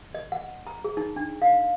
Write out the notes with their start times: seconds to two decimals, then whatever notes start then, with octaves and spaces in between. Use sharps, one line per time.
0.14 D#5
0.32 F#5
0.67 A#5
0.84 G#4
0.97 D#4
1.16 D4
1.42 F5